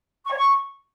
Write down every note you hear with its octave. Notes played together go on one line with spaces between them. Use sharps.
C#6
C#5
C#6